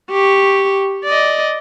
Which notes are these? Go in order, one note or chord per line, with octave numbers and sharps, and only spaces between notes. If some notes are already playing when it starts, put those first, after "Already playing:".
G4 C#6
D5 D#5